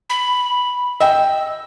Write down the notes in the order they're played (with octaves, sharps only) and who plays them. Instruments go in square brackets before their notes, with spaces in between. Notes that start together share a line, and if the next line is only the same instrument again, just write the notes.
[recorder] B5
[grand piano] D#5 G5 [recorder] E6